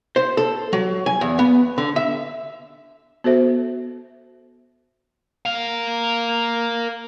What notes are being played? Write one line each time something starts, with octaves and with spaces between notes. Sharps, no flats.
C5
A4
F#3
G#5
E2
B3
D3
E5
B3 F#4 A4 C5 E5
A#4 F5